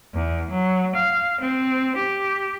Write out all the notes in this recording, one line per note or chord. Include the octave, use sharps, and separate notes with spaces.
E2
F#3
F5
C4
G4